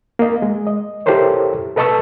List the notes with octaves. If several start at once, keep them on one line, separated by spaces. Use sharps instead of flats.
A#3 D#5
G#3
D#5
E4 G4 A4 A#4 C5 C#5
A4 B4 D#5 A5 C#6 E6